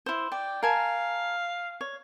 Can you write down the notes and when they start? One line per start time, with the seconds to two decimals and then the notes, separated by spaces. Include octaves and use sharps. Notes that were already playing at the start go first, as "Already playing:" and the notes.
0.06 E4 C5
0.32 D5 G5
0.63 A#4 F5 G#5 A5
1.81 C#5